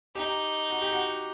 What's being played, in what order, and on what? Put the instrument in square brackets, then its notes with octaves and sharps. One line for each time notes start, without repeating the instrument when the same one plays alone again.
[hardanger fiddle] D#4 [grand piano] G4
[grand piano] F#4
G4
F#4